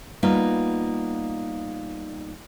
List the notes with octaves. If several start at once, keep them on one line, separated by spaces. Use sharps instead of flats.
G3 A#3 B3 D#4 F4